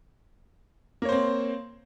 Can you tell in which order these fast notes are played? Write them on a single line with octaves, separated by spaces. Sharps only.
A#3 C#5 C5 C4